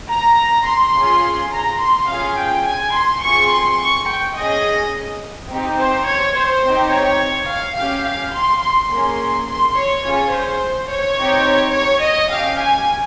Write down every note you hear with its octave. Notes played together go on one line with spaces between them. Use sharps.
A#5
C6
C#4 F4 G#4
A#5
C6
C#4 F4 G#4 F5
G5
G#5
C6
C4 F4 G#4 C#6
C6
C#6
G5
C#4 G#4 D#5
C4 D#4 G4
C5
C#5
C5
C4 D#4 G4
C#5
F5
C#4 G4 F5
F5
C6
C6
A#3 C#4 G#4 C6
C6
C#5
C#4 F4 G#4 C#5
C5
C#5
C4 D#4 G4
C#5
D#5
C#4 G4 F5
G#5